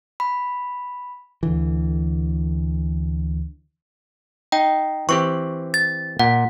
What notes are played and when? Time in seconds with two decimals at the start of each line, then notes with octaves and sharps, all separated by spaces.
0.20 B5
1.43 D2 D3 E3
4.52 D#4 G5
5.09 E3 C4 G4 C#6
5.74 A6
6.19 A#2 F#5